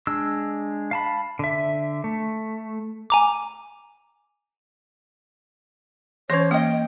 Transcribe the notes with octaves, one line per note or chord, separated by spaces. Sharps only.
G#3 D4 E6
F5 A5 B5
D3 E5
A3
G#5 A#5 D6
E3 C#4 C5 C#5 C#6 D6
A#3 D#5 G5 D#6